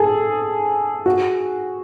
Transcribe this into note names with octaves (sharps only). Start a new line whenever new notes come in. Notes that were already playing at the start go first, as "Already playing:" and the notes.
Already playing: G#4 A4
F#4